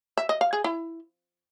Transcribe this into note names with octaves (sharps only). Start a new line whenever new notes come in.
E5
D#5
F5
G#4
E4